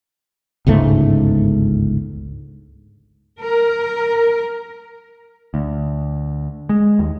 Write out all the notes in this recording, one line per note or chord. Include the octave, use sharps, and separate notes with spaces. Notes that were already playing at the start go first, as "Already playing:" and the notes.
G1 C#2 G#2 A3
A#4
D2
G#3
D#2